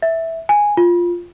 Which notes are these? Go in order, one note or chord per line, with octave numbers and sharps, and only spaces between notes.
E5
G#5
F4